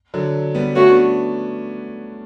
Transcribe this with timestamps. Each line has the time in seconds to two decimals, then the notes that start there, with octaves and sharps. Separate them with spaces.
0.14 D3 F#3
0.55 G3 B3
0.75 A3 C#4 F#4
0.89 B3 D4